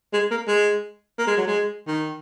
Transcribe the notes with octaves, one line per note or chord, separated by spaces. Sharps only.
G#3
A#3
G#3
A#3
G#3
F#3
G#3
D#3